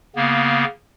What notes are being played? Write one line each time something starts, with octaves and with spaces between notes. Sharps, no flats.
C#3 A#3 B3